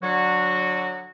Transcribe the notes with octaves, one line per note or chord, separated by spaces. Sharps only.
D3 F#3 F#4